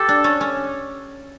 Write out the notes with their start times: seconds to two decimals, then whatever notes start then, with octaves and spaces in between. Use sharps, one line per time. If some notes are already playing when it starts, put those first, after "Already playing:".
Already playing: G4 A4
0.09 D4
0.24 C#4
0.41 C#4